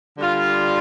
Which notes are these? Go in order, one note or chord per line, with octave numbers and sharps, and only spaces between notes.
D3 G3 F4